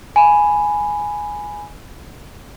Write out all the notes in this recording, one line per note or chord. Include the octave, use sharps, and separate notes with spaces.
G#5 B5